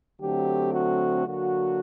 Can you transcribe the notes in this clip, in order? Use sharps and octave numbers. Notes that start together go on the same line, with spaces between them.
D3 F#3 A3 C4 G4
F#4
D3 F#3 A#3 F#4